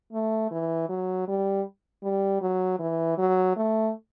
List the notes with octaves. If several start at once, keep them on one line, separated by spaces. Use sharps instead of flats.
A3
E3
F#3
G3
G3
F#3
E3
F#3
A3